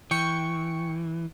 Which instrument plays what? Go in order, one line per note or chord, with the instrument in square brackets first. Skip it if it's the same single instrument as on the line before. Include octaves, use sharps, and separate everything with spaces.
[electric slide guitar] E3 [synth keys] G5 C#6 C#7